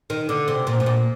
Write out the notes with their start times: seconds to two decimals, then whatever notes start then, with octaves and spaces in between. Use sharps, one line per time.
0.10 D#3
0.29 D3
0.48 C3
0.67 A#2
0.80 A2
0.86 A#2